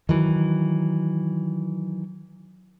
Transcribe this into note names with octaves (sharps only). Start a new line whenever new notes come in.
D#3 E3 F#3